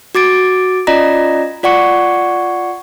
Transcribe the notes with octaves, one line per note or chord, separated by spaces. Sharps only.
F#4 D6 A6 D7
C#4 F4 D5 D#5 A#5 A#6
F4 D5 F#5 C#6 C#7